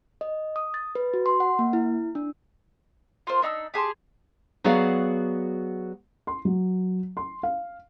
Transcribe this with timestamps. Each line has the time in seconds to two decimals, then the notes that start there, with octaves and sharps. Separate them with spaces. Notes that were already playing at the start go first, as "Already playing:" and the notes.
0.21 D#5
0.56 D#6
0.74 A6
0.95 B4
1.14 F#4
1.26 C6
1.40 F#5
1.59 A#3
1.73 E4
2.15 D4
3.27 F4 A#4 C5
3.42 D4 D#4 C6 E6
3.74 G4 G#4 A5 C6
4.64 F#3 B3 F#4 G#4 D5 F5
6.27 C6
6.45 F#3
7.17 C6
7.43 F5